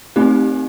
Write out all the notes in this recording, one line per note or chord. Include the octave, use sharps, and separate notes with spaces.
A3 C4 D#4 G4